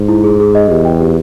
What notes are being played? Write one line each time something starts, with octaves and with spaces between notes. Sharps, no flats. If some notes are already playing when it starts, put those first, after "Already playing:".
Already playing: G#2
E4
G#4
G#4
D#5
E2 G4
G5
G4